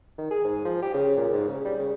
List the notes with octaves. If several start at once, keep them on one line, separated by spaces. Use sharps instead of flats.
D#3
G#4
G#2
F3
G4
C#3
A#2
G#2
C#3
G3
C#3